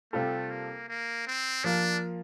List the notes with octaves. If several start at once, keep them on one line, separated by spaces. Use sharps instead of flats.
C3 G3 A3 C4 F4 A4
A#3
A#3
C4
F3 A#3 D4 F4